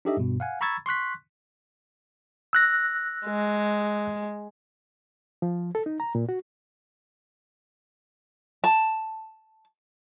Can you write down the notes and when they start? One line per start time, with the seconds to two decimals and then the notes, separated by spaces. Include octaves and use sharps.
0.05 D4 D#4 G4 A4 D#5 E5
0.17 G2 B2
0.40 F5 F#5 G#5
0.61 A#5 B5 C#6 E6 G#6 A6
0.86 C6 C#6 F#6 B6
2.53 E6 F#6 A#6
3.26 G#3
5.42 F3
5.75 A4
5.86 D#4
6.00 A#5
6.15 A#2
6.29 F#4
8.64 A5